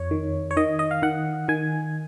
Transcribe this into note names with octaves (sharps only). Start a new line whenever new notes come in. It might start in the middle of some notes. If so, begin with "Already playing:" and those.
Already playing: F2 C#5
D#3
C#5
D#3 D#5
D#5
F5
D#3 F#5
D#3 G#5